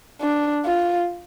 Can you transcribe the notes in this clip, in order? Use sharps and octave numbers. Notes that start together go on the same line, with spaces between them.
D4
F4